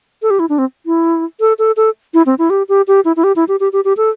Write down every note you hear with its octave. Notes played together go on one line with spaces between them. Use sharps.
A4
G4
E4
D4
C4
E4
A4
A4
A4
E4
C4
E4
G4
G4
G4
E4
E4
G4
E4
G4
G4
G4
G4
A4